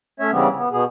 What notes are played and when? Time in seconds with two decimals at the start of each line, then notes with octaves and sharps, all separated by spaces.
0.20 A3 C#4 C#5 E5
0.32 C#3 E3 G3 B3 C4
0.58 B3
0.72 B2 B3 G#4